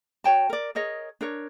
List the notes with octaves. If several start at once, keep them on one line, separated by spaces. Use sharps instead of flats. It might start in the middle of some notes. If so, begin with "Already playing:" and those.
F#4 C#5 G5 A5
A#4 D5
G#4 A#4 C#5 D#5
D4 A#4 C#5